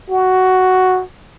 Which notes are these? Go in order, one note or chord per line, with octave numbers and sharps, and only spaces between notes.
F#4